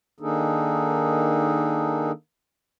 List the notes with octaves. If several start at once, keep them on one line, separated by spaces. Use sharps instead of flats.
D#3 A#3 D4 D#4 G#4 A4